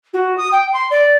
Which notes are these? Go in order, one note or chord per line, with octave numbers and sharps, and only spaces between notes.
F#4
D#6
G5
C6
D5